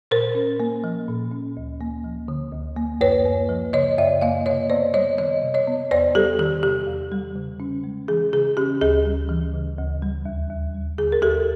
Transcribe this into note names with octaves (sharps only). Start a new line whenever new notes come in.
A#2 A#4 C5
C#4
A#3
F3
A#2
C#4
D2
A#3
F3
D3
D2
A#3
F#2 B4 C#5
A#3
F3
C#3 C#5 D#5
F#2 D5 E5
A#3 D#5 F5
C3 C#5 D#5
B3 C5 D5
G3 C#5 D#5
D#3 C#5 D#5
C3
C#5 D#5
B3
E2 C5 D5
G3 G4 A4
D#3 G4
C3 G4
E2
G3
C#3
C#4
G#3
E3 G#4
C#3 G#4
C#4 G4
D2 G#4
G3
E3
C#3
D2
G3
D#2
D#2
G3
D3 G#4
A#4
D#2 G4 A4